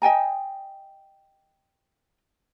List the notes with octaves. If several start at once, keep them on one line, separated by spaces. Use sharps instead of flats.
D#5 G5 G#5 A#5